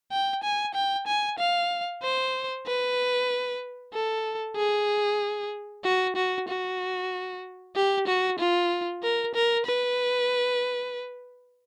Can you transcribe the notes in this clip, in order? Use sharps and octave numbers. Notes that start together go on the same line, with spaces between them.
G5
G#5
G5
G#5
F5
C5
B4
A4
G#4
F#4
F#4
F#4
G4
F#4
F4
A#4
A#4
B4